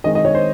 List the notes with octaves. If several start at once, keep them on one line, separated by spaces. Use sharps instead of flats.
D#3 G#3 C4 D#5
D#5
C#5
C5